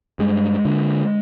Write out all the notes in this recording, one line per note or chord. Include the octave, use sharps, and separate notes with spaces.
G2 G#3
D3